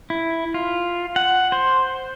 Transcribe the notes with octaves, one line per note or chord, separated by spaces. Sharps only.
E4
F4
F#5
C5